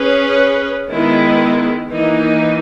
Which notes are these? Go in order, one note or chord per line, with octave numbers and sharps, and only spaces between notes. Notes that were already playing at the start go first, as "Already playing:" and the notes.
Already playing: C#4 G#4 B4
D#3 G#3 B3 E4
E3 A#3 D#4